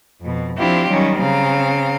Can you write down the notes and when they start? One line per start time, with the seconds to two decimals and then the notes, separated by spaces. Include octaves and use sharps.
0.20 F2 B2
0.57 F3 C4 D4 E4 F4 G4
0.89 D#3 F#3 G3 C#4
1.18 C#3 C4 F5 A#5